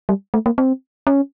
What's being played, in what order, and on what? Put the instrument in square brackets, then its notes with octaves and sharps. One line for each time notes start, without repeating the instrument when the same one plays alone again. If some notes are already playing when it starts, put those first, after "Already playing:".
[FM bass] G3
A3
A#3
C4
C#4